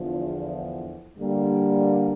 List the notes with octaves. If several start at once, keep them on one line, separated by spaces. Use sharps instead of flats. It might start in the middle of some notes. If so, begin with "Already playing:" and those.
Already playing: E2 D3 F3
D3 G3 A#3